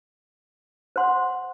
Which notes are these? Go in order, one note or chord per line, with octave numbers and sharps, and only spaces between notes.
C5 F#5 C6